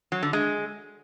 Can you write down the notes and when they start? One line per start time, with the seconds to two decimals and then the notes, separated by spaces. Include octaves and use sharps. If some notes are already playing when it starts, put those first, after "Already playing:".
0.12 F#3
0.23 D3
0.33 G#3